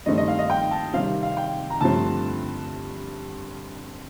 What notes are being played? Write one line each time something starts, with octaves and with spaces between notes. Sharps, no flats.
G2 D#3 A3 C4 D#5
D#5
F5
D#5
G5
A5
C3 D#3 G3 C4 F5
F5
G5
A#5
G2 D3 F3 A3 C4 A5